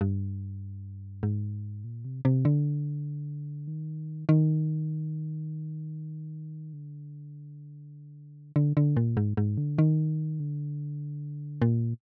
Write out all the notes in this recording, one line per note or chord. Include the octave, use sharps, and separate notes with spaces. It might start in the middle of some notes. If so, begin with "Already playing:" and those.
G2
G#2
A#2
C3
C3
D3
D#3
D#3
D3
D3
D3
A#2
G#2
G#2
D3
D#3
D3
A#2